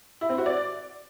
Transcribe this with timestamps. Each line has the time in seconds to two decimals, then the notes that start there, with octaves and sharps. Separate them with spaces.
0.21 E4
0.29 C4
0.38 F#4
0.46 D5